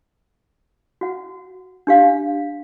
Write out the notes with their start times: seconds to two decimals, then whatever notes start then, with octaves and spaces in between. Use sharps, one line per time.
1.01 F#4 F#5
1.87 D4 G4 F5